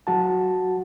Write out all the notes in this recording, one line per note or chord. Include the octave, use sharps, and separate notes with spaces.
F#3 F#4 A5